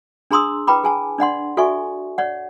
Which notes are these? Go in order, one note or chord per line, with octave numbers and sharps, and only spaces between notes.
D4 G#4 A#5 C6 D#6 E6
E4 B4 G5 A#5 B5 D6
G#4 G#5 A5
D4 D5 F#5 C6
F#4 A4 D5 E5 G#5 C#6
C#5 D5 F#5